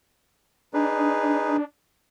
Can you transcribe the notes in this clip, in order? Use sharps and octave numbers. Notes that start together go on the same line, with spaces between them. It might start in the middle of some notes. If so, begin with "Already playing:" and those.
D4 D#4 G#4 B4